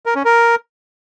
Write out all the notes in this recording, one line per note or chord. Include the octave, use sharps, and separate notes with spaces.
A#4
C#4
A#4